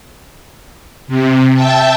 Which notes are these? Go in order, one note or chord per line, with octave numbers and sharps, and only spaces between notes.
C3
E5 G5 A5